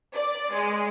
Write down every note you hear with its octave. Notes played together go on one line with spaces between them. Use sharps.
D5
G#3